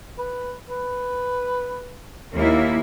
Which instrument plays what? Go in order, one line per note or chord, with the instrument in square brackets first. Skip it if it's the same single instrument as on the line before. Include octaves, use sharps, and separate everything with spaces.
[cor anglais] B4
B4
[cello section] D#2 A#3 E4